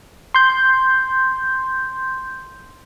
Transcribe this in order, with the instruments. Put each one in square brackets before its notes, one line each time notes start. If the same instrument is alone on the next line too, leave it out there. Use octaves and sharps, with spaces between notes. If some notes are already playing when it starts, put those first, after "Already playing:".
[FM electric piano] C6 G6